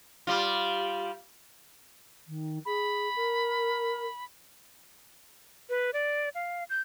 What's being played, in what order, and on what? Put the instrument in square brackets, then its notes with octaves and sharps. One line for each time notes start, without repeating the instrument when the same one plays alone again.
[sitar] G3 F4
[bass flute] D#3
[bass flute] G#4 [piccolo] B5
[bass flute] A#4
[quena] B4
D5
F5
G6